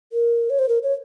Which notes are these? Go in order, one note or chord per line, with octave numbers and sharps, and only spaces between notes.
A#4
C#5
C5
A#4
C#5